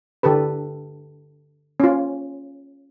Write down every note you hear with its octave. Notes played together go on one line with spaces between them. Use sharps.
D3 G4 A4 B4
C#4 F4